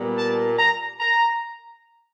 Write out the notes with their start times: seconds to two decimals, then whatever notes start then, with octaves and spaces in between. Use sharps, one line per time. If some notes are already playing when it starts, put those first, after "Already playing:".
Already playing: A#2 G3 B3
0.17 A5
0.58 A#5
1.00 A#5